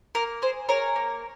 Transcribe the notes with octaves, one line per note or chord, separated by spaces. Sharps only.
A#3 A#4
G#4 C5
G#4 A#4 C#5
A#3